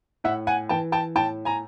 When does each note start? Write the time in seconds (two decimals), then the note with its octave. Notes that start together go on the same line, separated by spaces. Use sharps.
0.24 A2 E5 F#5
0.47 F#5 G#5
0.69 E3 G5 A5
0.92 G5 A5
1.15 A2 G5 A5
1.45 G#5 A#5